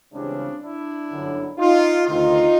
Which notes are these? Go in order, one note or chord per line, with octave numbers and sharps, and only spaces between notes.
C#2 C#3 E3 G3 C4 D4
D4 E4
G1 F#2 D3 F#3
D#4 F4
D2 C3 D#3 D#4 F4